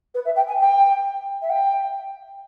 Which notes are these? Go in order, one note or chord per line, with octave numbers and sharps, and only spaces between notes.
B4
E5
G5
G#5
G5
E5
G5